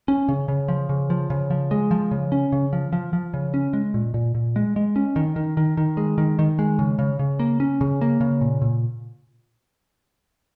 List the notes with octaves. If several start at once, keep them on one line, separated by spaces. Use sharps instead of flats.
C#4
C#3
C#3
F3
C#3
F3
C#3
F3
G#3
F3
C#3
C#4
C#3
F3
F3
F3
C#3
C#4
G#3
A#2
A#2
A#2
G#3
G#3
C#4
D#3
D#3
D#3
D#3
G#3
D#3
D#3
G#3
C#3
C#3
C#3
A#3
C#4
C#3
A#3
C#3
A#2
A#2